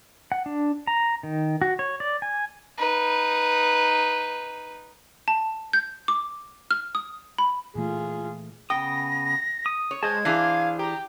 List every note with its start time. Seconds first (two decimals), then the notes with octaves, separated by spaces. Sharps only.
0.32 F#5
0.46 D4
0.87 A#5
1.23 D#3
1.61 F#4
1.79 C#5
2.00 D5
2.22 G#5
2.78 D#4 B4
5.28 A5
5.73 G6
6.08 D6
6.71 F6
6.95 D#6
7.38 B5
7.75 A#2 E3 A3 F4 G#4
8.70 C#3 B3 G5 D#6 A#6
9.66 D#6
9.91 C#5
10.03 G#3 C5 D#5 A5 G#6
10.25 E3 D4 G#4 C5 F5
10.79 G4 A#5